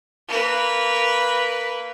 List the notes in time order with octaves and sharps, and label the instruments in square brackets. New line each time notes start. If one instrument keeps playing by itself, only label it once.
[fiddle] A#3 B4